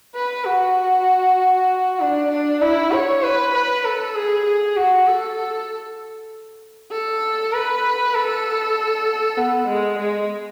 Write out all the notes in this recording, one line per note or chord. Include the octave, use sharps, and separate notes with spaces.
B4
F#4
D4
D4
E4
C#5
B4
B4
A4
G#4
G#4
F#4
A4
A4
B4
A4
B3
G#3
G#3